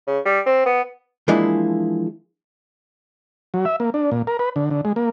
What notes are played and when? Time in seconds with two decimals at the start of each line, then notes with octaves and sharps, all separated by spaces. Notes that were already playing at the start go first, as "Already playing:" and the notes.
0.07 C#3
0.25 G3
0.46 C4
0.66 B3
1.28 E3 F3 G#3 A#3 D4 E4
3.54 F#3
3.65 E5
3.80 A#3
3.94 D4
4.11 A#2
4.27 A#4
4.39 B4
4.56 D3
4.71 D3
4.85 G#3
4.96 A#3